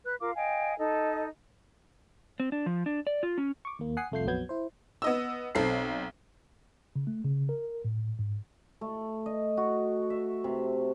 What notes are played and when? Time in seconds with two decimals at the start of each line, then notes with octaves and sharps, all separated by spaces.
0.05 B4 F#6
0.21 F4 A#4 F5 D6
0.35 D#5 F5 G5 G#5
0.78 D#4 A4 D#5
2.40 C4
2.52 D4
2.66 F3
2.86 D4
3.07 D5
3.23 F4
3.38 C#4
3.65 C#6 D6
3.79 D#2 A#3
3.97 F#5 G#5 D#6 C7
4.12 C2 F2 A3 F4 G6 C7
4.27 A#1 F2 F#3 B3 G6 G#6
4.49 E4 C5
5.02 B3 D#5 E6
5.55 B1 C4 A4 C7
6.96 C#3
7.07 A3
7.24 C#3
7.49 A#4
7.85 A2
8.19 G#2
8.81 A3
9.26 D#5
9.57 F#4
10.10 E5
10.44 C3